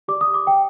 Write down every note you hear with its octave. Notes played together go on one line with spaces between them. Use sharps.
G4 D5 D6
D#6
D6
G5